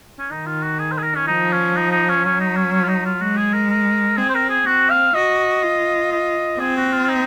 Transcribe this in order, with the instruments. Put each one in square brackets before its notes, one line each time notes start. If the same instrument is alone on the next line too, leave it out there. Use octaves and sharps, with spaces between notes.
[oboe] C#4
[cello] D#3 [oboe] D#4
[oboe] F4
F#4
G#4
C5
G#4
A#4
C#4
[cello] F3 [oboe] D#4
[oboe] C#4
D#4
D#4
C#4
[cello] F#3 [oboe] C#4
[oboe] D#4
C#4
C#4
F4
D#4
F4
[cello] G#3 [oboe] F#4
[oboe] G#4
A#4
A#4
[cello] C4 [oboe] G#4
[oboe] C5
A#4
G#4
[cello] C4 [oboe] F#4
[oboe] F5
[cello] F#4 [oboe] D#5
[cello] F4
[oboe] D#5
[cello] C4 [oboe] G#4
[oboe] F#4
F4
F4
D#4